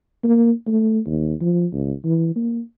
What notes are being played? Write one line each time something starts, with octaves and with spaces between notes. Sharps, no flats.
A#3
A3
D#2
F3
C#2
E3
A#3